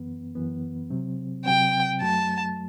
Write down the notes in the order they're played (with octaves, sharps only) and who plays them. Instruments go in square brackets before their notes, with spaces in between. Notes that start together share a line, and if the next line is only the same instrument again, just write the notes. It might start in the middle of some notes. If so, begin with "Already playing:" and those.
Already playing: [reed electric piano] F#2 E3 B3
F#2 E3 B3
C3 F#3 C4
[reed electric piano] C3 F#3 C4 [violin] G5
[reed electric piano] F#2 F#3 A3 [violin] A5